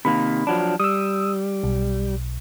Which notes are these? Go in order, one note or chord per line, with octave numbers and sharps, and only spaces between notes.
C3 D#3 A#3 B5
F3 F#3 D4
G3 D#6 E6
B1